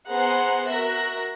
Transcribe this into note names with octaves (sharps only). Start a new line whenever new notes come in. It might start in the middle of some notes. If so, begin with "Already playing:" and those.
B3 G#4 C5 F#5 A#5 C6
F#4 A#4 E5 F#6 A#6